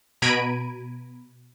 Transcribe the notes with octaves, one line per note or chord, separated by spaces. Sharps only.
B2 A#5 B5 G#6 D7 D#7